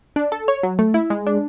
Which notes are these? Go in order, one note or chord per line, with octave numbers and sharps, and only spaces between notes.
D4
A4
C#5
F#3
A3
E4
G#3
D4